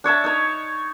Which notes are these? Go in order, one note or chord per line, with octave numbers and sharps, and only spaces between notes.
D4 C#5 E5 A5
D#4 C#5